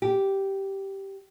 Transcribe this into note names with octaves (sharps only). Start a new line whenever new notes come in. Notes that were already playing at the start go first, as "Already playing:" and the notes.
G4